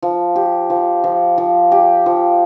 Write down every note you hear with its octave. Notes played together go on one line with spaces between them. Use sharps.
F3
G4
F3
F3
F3
G4
F3